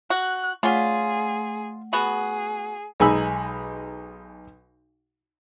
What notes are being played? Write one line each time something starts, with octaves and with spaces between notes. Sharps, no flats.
F#4 F#6
A3 C#4 F4 G#4 F#5
B3 F#4 G#4
B1 G#3 D#4 G#5 B5 E6